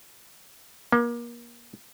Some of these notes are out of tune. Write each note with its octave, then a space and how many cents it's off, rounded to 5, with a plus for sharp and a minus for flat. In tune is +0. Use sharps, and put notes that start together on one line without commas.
A#3 +30